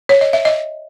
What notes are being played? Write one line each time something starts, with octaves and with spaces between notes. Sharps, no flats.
C#5
D#5
E5
D#5